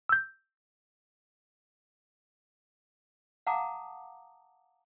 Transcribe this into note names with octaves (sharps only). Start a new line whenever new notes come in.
E6 G6
F5 F#5 A5 A#5 D6 D#6